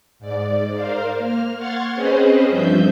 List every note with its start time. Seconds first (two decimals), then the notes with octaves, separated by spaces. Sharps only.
0.20 G#2 D5
0.75 A#4 C5 F5
1.18 A#3 F6
1.57 F#5 C6 C#6 F6 G#6 A6
1.93 C4 C#4 G#4 B4 C5 D#5
2.48 G2 F3 E5 G6